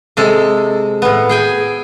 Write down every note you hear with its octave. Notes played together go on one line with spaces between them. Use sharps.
C3 G#3 A4
A2 B3
G#4 G5 G#5